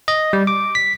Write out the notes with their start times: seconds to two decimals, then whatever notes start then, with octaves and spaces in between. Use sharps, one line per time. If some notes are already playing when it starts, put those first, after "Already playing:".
0.08 D#5
0.33 G3
0.47 D6
0.75 B6